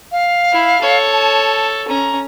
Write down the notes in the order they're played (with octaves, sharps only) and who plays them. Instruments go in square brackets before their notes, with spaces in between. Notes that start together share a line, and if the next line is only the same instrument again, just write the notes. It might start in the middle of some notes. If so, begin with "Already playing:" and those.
[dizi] F5
[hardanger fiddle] E4
A4 C#5
[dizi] A5
[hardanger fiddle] C#4 [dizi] A#5